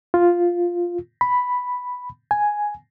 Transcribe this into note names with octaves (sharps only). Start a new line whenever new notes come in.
F4
B5
G#5